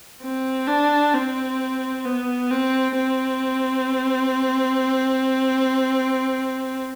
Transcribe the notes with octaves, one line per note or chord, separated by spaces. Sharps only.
C4
D4
C4
B3
C4
C4